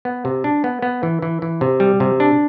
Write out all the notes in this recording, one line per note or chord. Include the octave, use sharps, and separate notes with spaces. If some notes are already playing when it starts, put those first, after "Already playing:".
B3
C3
D4
B3
B3
E3
E3
E3
C3
G3
C3
D4